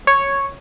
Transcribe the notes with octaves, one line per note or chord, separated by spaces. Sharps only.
C#5